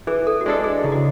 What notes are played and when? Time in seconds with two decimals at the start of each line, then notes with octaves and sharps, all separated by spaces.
0.07 E3 G#4
0.27 A4
0.41 F#4
0.46 G#3 D4 G#4 A4
0.64 G#4
0.84 C#3 E4
0.92 F#4